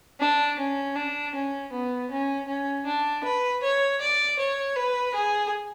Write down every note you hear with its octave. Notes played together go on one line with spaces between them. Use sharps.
D4
C#4
D4
C#4
B3
C#4
C#4
D4
B4
C#5
D5
C#5
B4
G#4